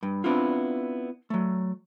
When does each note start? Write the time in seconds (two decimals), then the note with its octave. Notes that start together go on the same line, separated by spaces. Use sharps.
0.03 G2
0.24 B3 C4 D4 E4 F4
1.30 F#3 A3